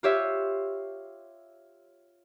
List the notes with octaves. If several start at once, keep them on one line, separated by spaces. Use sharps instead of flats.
F4 G4 C#5 E5